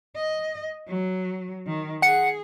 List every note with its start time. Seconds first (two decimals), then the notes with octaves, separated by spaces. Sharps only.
0.16 D#5
0.88 F#3
1.67 D#3
2.02 G#4 F#5 C#7